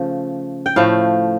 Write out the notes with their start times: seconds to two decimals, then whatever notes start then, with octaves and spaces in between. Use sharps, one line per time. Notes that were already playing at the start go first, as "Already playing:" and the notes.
Already playing: C#3 F3 A3
0.66 G5
0.76 A2 F3 A3 F5